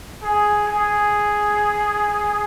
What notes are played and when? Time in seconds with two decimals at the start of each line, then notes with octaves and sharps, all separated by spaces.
0.23 G#4
0.68 G#4